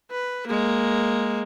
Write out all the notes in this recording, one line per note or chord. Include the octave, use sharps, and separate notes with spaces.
B4
G#3 A#3